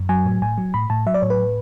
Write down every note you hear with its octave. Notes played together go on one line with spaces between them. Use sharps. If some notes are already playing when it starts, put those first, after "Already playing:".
Already playing: F#2
F#3 G#5
A2
A2 G#5
F#3
A2 B5
A2 A5
F#3 E5
D5
A2 C#5
B4